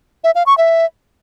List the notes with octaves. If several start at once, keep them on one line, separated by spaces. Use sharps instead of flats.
E5
F5
C#6
E5